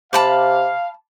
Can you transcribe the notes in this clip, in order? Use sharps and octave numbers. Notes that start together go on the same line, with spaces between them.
C3 F5 A5 B5 D6